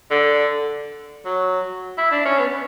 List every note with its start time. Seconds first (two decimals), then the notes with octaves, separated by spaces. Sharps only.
0.11 D3
1.25 F#3
1.98 E4
2.12 D4
2.25 C#4
2.39 B3